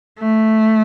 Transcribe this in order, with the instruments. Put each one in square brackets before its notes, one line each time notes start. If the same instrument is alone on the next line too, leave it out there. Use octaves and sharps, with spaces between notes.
[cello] A3